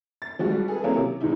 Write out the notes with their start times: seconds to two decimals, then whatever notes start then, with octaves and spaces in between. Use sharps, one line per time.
0.22 A6
0.39 F3 G3 G#3 F#4
0.68 G#4 A4 B4
0.84 F#3 A#3 C4 C#4 E4 A#4
0.97 C3
1.21 E2 A2 D#4 E4